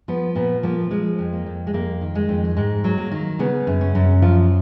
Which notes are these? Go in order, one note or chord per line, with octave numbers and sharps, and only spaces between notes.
F3 B3
A#2 B3
F3 A#3
F3 G#3
F2
A#3
F2
G#3
F2 A#3
D#3
G#3
F2
G#2 G#3
F#3
A#3
D#3
C#3 B3
F#2
C#4
F#2
F3 F4